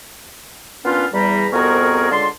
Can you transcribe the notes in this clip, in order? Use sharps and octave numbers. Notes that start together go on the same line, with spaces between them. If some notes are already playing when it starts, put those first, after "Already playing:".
A#2 B3 C#4 D4 F4
E2 G3 A#5 B5
C2 F2 B3 F#4 G#4 A#4
C#2 D3 G#3 A5 C6